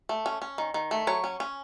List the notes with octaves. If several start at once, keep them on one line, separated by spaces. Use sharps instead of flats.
A3
C#4
C#4
D#3
D#3
A3
F#3 C#5
C#4
C#4